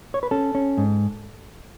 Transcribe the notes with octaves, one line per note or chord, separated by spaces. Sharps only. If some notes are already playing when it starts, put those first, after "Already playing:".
C#5
B4
C#4 A4
C#4
G#2